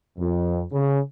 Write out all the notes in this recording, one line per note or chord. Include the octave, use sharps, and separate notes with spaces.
F2
C#3